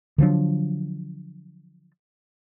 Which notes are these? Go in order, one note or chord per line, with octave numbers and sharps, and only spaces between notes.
D3 F3 F#3 D4